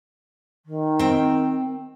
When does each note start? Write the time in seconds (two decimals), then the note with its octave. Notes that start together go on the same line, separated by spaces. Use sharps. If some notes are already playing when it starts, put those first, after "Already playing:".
0.65 D#3
0.99 C4 G5